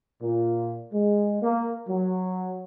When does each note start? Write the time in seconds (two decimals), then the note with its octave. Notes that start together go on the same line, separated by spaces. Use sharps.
0.20 A#2
0.92 G#3
1.42 A#3
1.87 F#3